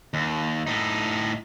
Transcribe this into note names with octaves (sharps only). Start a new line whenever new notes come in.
D#2
A2 D#4